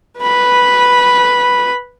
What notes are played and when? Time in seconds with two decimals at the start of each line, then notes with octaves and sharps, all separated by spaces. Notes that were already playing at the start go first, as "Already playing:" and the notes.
0.20 B4 B5